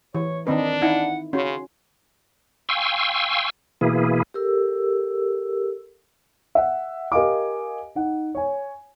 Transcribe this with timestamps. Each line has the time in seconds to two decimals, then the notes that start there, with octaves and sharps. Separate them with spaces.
0.15 E3 C#5
0.47 D#3 C4 D4 D#4 B4
0.82 D#4 E4 F#5
1.33 C#3 C#4 F#4 C6
2.69 F5 G5 G#5 C6 C#6 E6
3.81 B2 E3 A#3 E4 G#4
4.34 G4 A4 A#4 E6
6.55 E5 F#5
7.12 G4 A#4 D#5 F5 G#5 D6
7.96 D#4 F#5
8.35 C#5 G#5